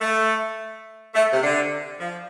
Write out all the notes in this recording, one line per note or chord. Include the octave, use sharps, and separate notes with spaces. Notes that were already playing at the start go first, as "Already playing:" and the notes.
A3
A3
C3
D3
F3